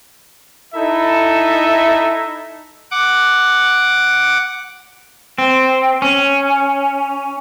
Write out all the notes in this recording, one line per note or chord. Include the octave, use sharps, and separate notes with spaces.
D#4 E4 A4 E5
F#5 D6
C4
C#4